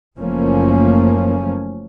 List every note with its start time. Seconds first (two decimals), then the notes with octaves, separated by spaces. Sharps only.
0.18 F#1 F3 A3 A#3 C#4